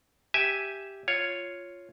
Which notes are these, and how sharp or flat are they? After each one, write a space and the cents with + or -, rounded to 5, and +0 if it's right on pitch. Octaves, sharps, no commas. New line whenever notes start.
G4 +0 E5 +0 G#5 +0
F4 +0 C#5 +0